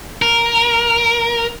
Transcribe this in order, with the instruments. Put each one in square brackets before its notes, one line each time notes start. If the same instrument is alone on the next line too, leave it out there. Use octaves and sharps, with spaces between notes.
[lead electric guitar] A#4